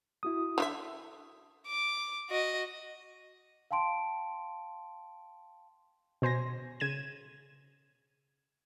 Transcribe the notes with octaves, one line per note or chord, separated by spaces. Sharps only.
E4 F#4 D#6
D3 F4 E5
D6
F#4 D#5
F5 G5 A5 C6 D7
B2 C5 G#5 A#6
C#3 G#6 D#7 E7